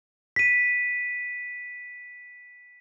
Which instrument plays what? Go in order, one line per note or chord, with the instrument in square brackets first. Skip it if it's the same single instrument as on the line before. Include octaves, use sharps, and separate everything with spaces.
[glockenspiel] B6 D#7